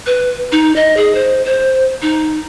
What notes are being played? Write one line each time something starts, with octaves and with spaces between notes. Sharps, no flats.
B4
D#4
D#5
G#4
C5
C5
D#4